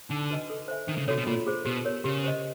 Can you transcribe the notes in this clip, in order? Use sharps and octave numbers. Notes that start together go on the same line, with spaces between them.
D3 D#4
F#4 B4 D#5 G#5
A4
C5 E5 G#5
D#3 D4
C#3
C3 F#4 A4 C#5
B2
A#2 F4
G#4 C5
B2 G4
A#4 C#5
C#3 G4
C5 D#5